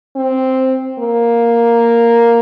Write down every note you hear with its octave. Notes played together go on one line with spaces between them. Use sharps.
C4
A#3